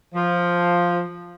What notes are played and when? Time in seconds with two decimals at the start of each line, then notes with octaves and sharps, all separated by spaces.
0.15 F3